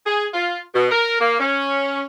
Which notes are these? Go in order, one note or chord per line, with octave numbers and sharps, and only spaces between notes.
G#4
F4
B2
A#4
A#3
C#4